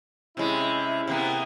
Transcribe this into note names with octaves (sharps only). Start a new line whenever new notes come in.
C3 G#3 C#4 E4
C3 A#3 B3